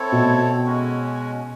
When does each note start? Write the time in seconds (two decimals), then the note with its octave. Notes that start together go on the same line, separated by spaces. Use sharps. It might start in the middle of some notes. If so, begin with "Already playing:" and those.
Already playing: C4 E4 A4 C#5
0.12 B2
0.66 G#3 C#4 F#4